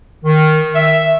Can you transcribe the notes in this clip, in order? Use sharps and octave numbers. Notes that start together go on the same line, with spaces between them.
D#3
E5